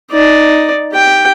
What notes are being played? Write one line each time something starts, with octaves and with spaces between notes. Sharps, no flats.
D#4 D5
G4 G5